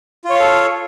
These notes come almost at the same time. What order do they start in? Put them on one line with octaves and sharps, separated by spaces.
F4 C#5 F5 A4